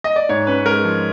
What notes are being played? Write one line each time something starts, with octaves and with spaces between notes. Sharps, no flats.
D#5
D5
G#2 C#5
C#4 B4
G#3 A#4
F3